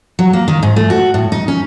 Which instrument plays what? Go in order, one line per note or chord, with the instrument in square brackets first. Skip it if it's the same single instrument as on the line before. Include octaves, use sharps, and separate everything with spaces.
[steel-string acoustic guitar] F#3
A#3
D#3
G#2
A3
F#4
A2
D#4
C#4